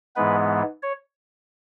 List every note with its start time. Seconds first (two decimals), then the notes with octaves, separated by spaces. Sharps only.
0.16 G#2 E3 G#3 B3 B4
0.83 C#5